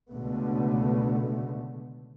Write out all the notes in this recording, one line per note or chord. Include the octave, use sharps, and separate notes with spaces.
C#2 B2 D3 A3 B3